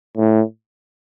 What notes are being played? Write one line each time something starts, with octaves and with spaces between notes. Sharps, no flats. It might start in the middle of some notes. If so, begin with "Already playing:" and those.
A2